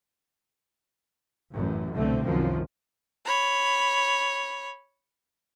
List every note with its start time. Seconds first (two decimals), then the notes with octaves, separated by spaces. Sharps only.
1.52 A1 F#2
1.93 C2 B2 D3 A3 C4
2.24 C2 F#2 D#3 F3
3.25 C#5 B5